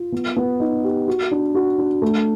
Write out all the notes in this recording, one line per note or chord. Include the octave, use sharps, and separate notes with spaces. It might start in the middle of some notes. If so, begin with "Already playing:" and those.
Already playing: F4
B3
B3
D#4
G4
F#4
D4
F#4
D4
A3